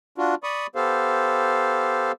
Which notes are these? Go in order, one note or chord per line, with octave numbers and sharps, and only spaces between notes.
D4 F4 F#4
D5 B5 C#6 D#6
B3 G4 A4 C5 F5